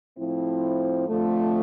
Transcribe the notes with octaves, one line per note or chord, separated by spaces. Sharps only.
A2 F3 C4 E4
F2 D3 F3 A3